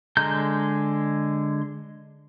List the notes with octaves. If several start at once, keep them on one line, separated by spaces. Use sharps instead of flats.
D3 G#3 A#5 G6